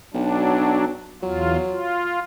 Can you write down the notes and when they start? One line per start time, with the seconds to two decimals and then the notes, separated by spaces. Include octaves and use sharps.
0.14 B1 F#3 D4
1.23 E2 F#3 F4
1.67 F4